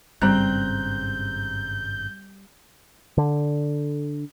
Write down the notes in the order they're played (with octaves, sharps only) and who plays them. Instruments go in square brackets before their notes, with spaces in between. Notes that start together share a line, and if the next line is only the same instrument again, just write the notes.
[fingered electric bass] G#1 G2 C#3 [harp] G3 [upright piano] C4 A#5 F#6 [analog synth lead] G6
[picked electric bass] D3